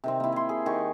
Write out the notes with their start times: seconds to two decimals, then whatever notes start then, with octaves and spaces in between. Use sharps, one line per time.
0.04 C3 D#3 C4
0.20 A#3 E4
0.32 G#5 C6
0.49 G#4
0.66 D#3 G4 G#4 C#6